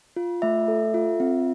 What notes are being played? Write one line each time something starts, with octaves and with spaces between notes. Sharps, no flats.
F4
A3 E5
A4
F4
C4